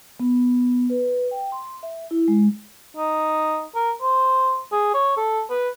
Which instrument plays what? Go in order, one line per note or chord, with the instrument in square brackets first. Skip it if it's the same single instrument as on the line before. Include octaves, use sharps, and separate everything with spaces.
[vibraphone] B3
B4
G5
C6
E5
E4
G#3
[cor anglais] D#4
A#4
C5
G#4
C#5
A4
B4